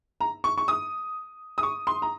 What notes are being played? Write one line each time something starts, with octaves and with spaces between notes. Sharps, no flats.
A#5
C#6
C#6
D#6
D#6
C#6
C6
A#5